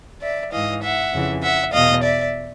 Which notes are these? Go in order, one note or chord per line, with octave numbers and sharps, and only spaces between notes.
D5 E5
G#2 E3 D#5 F5
E5 F#5
F2 C#3 E3
E5 F#5
E2 B2 D#5 F5
D5 E5